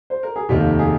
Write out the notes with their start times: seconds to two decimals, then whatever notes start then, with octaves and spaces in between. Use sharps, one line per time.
0.10 C5
0.23 A#4
0.36 G#4
0.49 F1 D#2 D#3 G4
0.79 G#4